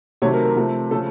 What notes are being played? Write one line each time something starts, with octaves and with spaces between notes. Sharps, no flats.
C3 D#3 F#3 A3 C#5
A#4
A#4
C3 F3 A3
C#3 F3 A3 C#4 A4